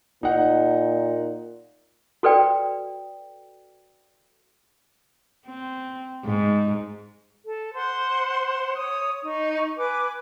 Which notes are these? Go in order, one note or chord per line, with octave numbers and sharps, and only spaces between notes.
A#2 D#4 F#5
F#4 A4 B4 D5 G5
C4
G#2
A4
C5 F#5 C6
C#5 D#6
D#4 C#6
B4 G#5 D6